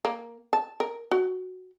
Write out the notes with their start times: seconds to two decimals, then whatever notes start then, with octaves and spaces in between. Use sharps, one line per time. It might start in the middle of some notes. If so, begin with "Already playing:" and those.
0.05 A#3
0.53 A5
0.80 A#4
1.11 F#4